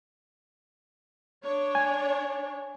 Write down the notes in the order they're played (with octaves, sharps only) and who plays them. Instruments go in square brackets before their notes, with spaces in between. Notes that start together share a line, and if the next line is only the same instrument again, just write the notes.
[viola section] D4 C#5
[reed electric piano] G#5